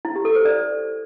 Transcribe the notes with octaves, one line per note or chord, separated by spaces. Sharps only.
E4
G4
A4
C5
D5